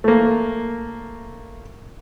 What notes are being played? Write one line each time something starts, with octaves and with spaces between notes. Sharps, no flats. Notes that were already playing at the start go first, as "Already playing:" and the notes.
A3 A#3